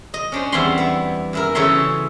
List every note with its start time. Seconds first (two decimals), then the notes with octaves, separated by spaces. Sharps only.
0.14 D#5
0.32 C#4 D4 C5
0.52 E2 E3 G3 C4 B5 C6
0.78 B3 E4
1.33 F#2 E4 A#4
1.55 C#3 E3 A4 C#5 E5 C6